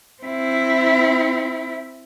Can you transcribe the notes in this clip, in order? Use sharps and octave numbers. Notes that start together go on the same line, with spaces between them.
C4 E4